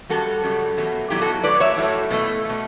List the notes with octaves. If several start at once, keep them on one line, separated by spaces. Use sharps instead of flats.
F#2 C#3 G3 F#4 A4
F#2 C#3 G3
E2 B2 F#3 A3
E2 B2 F#3 E4 G4
F#4 A4
A2 F#3 A3 B4 D5
C#5 E5
A2 F#3 A3
B2 A3
B2 A3